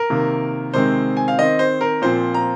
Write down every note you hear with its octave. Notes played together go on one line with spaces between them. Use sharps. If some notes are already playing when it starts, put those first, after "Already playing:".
Already playing: A#4
C3 D#3 A#3
C3 D#3 G#3 C4 C5
G#5
F5
D#3 C4 D#5
C5
A#4
A#2 F3 C4 C5
A#5